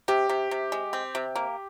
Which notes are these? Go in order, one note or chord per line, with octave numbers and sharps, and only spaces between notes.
C3 G4
C3
C3
G#3
C4
C3
A#3